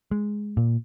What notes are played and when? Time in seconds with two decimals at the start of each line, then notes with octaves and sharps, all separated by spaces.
0.11 G#3
0.57 A#2